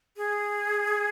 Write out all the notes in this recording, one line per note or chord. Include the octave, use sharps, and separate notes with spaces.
G#4